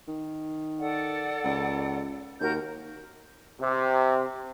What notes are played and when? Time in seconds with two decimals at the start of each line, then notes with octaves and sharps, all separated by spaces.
0.08 D#3
0.80 A4 D5 F#5
1.44 C#2
2.40 D#2 F#4 A#4 G6
3.61 C3